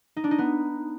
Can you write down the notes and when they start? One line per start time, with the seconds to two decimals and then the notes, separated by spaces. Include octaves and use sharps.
0.16 D#4
0.24 D4
0.31 D#4
0.38 B3